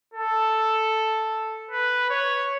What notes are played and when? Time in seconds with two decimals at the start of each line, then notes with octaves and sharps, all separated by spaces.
0.14 A4
1.71 B4
2.10 C#5